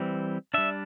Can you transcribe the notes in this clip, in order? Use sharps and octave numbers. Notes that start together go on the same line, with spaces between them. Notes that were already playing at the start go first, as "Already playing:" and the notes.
Already playing: E3 G3 C4
G3 D4 E5